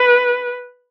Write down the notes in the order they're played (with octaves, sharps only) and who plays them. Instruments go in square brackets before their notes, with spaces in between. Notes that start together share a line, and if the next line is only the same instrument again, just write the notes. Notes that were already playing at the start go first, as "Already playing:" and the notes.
Already playing: [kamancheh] B4